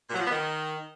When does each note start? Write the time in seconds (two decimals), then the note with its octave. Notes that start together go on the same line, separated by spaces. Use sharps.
0.09 A#2
0.14 F#3
0.19 F3
0.24 B3
0.29 D#3